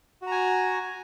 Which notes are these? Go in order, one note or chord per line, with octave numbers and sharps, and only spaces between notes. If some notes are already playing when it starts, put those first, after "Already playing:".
F#4 G#5 A#5